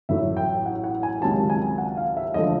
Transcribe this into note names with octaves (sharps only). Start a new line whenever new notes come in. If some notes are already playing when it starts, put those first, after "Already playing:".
A1 A2 F#3 A3 E5
G5
F#5
F#5
G#5
C#2 C3 D#3 F#3 A5
A5
G#5
F#5
F5
E5
E1 D3 F3 A3 D#5